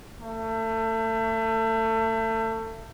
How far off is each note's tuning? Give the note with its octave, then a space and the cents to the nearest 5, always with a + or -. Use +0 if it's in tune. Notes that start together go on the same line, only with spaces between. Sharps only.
A3 +30